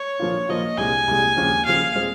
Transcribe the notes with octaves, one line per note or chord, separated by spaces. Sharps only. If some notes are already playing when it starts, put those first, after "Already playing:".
Already playing: C#5
A#2 F3 A#3 F4
A#2 F3 A#3 F4 D#5
C2 A#2 G#3 G#5
C2 A#2 G#3
D#2 C#3 F3
D#2 C#3 F3 F5
A#2 G#3 C4